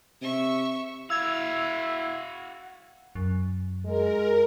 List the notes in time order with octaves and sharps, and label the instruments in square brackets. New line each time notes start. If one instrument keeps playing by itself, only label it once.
[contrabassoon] C3 [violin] E5 C#6
[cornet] E4 [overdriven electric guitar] F#4 F5 [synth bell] E6 G#6 F7
[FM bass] F#2
[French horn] G#3 [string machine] A#4